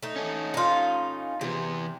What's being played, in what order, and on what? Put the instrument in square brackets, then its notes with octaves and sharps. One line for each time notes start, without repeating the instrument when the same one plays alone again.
[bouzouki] A3 D#4
[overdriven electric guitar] C#4 A4
[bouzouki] D#4 F4
[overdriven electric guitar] E2 B3 [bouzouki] C3